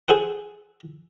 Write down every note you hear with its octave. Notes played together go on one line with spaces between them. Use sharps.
G#4 A4 C5 F#5